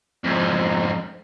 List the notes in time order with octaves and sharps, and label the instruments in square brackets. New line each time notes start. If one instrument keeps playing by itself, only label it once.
[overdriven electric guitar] F2 G#2